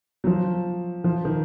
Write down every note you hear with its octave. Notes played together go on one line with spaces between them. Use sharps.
F#3
F3
F3
D#3